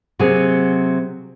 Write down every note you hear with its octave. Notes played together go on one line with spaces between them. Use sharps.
C3 F#3 A#3 C4 G#4